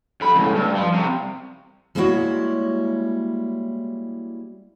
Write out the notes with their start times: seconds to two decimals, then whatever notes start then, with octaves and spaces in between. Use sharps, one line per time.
0.21 F2 B5
0.35 C#2 A2
0.55 G2
0.75 F3
0.93 C2 C3
1.95 G3 G#3 A#3 E4 F#4 C#5